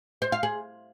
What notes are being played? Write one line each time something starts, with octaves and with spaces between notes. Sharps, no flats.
C5
F5
G#4